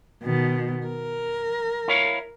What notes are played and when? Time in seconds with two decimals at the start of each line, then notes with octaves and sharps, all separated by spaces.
0.23 B2 D#3
0.86 A#4
1.88 E4 C#5 F5